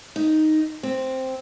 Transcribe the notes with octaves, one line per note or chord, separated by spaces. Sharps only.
D#4
C4